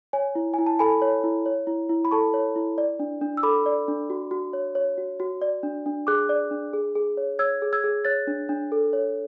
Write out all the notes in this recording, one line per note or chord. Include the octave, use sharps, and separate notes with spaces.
C#5 G#5
E4
E4 G#5
A5
A4 G#5 B5
C#5
E4
C#5
E4
E4
B5
A4 A5 C#6
C#5
E4
D5
D4
D4
E6
A4 B5 D6
D5
D4
F#4
F#4
C#5
C#5
F#4
F#4
D5
D4
D4
G#4 D6 F#6
D5
D4
G#4
G#4
C#5
C#5 E6 G#6
G#4
E6 G#6
G#4
C#5 F#6 A6
D4
D4
A4
C#5